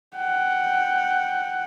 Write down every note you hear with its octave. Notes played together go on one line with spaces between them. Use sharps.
F#5 G5